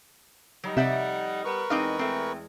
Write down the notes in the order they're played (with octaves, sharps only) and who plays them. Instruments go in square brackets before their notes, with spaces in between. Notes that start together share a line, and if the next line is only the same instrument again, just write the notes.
[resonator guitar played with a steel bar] F#3 [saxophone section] G3 D#4
[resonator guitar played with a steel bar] F2 D5 E5 [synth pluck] C3 G6 [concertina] F#5
[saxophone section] G3 B3 [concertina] A#4 B4 C#6
[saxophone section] E2 G#3 [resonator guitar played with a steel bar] C4 D#4 D#5 [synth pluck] F5 D6
[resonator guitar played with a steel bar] A3 C4